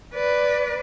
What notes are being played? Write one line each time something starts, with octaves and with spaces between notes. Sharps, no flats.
B4 D5